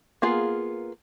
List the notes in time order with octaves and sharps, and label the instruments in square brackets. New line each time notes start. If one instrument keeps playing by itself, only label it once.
[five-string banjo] A#3 B3 F4 G#4